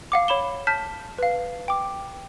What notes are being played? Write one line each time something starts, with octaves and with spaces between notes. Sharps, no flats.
F5 F#5 D6
C#5 B5 E7 G7
A5 F6 G6 B6
B4 F5
G5 D6